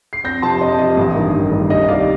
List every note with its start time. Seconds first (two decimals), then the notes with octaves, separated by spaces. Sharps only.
0.13 C7
0.24 F2 G6 A#6
0.42 C3 F3 A5 C6
0.61 F2 D#5
0.79 C3 F3 D#5
0.97 A1
1.15 G2 D#3 A#3
1.34 A1
1.51 G2 D#3 A#3
1.69 C2 D#5
1.83 D#5
1.88 C3 D#3 G3 D5 F5